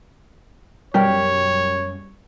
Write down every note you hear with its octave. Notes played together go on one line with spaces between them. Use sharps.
F#2 B2 G3 G4 A#4 C#5 G5